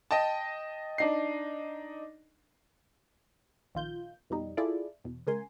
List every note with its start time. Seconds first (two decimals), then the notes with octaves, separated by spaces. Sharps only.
0.11 D#5 G5 A5
0.98 D4 D#4 C7
3.75 A#1 D#3 F4 G6
4.30 F2 B2 G3 D#4
4.57 E4 F4 G#4 A4 D5
5.04 E2 B2
5.27 C#3 G#3 A#4 G#5 C6